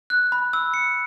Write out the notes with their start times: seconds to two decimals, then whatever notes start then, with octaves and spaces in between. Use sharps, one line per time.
0.10 F#6
0.32 B5
0.53 E6
0.74 C#7